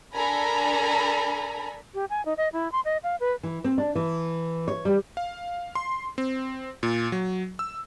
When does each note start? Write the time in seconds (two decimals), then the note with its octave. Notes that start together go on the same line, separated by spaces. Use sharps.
0.15 D4 A4 A#4 G#5 A#5 B5
1.94 G4
2.10 G#5
2.25 D#4
2.37 D#5
2.53 E4
2.72 C6
2.85 D#5
3.03 F5
3.20 B4
3.43 E3
3.64 C4
3.78 D4
3.95 E3
4.68 C#5
4.85 G3
5.17 F5
5.75 C6
6.18 C4
6.83 A#2
7.12 F#3
7.59 E6